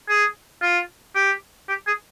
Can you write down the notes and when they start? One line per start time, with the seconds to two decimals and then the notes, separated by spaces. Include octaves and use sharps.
0.09 G#4
0.62 F4
1.15 G4
1.68 G4
1.87 G#4